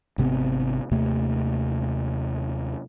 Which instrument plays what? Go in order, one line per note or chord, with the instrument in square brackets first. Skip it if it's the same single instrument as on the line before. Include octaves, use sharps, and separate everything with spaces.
[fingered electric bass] G#1 C3 B3 C4
D#2 C3 A3